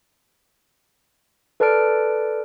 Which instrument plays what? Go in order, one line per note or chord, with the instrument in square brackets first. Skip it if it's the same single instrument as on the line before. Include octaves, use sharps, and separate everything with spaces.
[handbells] A4 B4 D5 A5 F6 D7